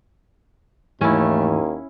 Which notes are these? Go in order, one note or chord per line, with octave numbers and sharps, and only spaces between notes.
D#2 G#2 E3 G#3 A3 C#4 E4